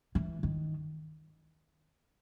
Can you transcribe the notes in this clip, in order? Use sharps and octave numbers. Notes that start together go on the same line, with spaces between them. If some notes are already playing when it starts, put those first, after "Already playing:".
E3
D#3